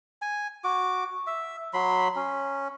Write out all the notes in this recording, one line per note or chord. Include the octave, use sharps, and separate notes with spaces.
G#5
F#4 D6
E5
F#3 B5 C6
C#4